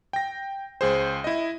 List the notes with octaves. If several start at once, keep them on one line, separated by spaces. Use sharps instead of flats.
G5 A#6
C#2 G#4 C5
E4 D#5